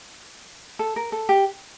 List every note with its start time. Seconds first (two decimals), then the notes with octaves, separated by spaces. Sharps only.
0.79 A4
0.96 A#4
1.12 A4
1.29 G4